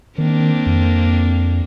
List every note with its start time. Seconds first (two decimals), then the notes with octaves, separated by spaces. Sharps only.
0.18 D#3 A#3 C4 D4
0.66 F2